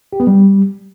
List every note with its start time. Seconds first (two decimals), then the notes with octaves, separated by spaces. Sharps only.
0.13 G4
0.20 B3
0.27 G3